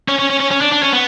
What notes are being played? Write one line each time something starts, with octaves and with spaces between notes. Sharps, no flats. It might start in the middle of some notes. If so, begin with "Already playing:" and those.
C#4
C#4
C#4
C#4
C#4
D4
D4
C#4
B3